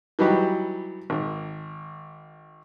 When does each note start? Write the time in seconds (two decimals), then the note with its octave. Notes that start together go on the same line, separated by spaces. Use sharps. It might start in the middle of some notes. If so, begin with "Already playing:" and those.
0.19 E3 F#3 G3 D#4 F#4 G4
1.10 G#1